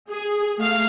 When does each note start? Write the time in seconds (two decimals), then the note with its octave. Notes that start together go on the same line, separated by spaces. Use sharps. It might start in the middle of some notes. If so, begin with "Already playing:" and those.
0.10 G#4
0.59 A3 F5